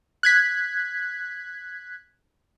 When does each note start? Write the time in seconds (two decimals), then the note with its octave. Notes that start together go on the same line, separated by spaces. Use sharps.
0.23 F#6 G#6 B6